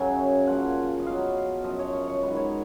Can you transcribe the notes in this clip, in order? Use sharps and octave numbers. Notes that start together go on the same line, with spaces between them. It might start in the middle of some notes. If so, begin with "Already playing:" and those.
Already playing: F#2 C#3 F#3 G#5
A#2 F3 F#5
D#5
B2 F#3 F5
F#2 F3 D#5
C#5
C#5
C#5
G#2 D#3 F#3 B4
C#5